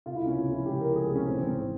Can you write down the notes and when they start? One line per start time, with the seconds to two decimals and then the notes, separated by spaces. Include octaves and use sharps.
0.06 C3 F4
0.16 E4
0.22 C#2 C#4
0.36 C3
0.51 F3 E4
0.66 C#2 G4
0.81 C#2 A#4
0.96 F3 G#4
1.11 C3 C#4
1.26 E3 C4
1.41 G#1 C4